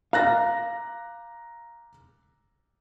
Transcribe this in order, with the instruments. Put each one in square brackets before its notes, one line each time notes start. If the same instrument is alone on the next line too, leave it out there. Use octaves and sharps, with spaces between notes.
[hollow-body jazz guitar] F5 [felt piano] A#5 F#6 A#6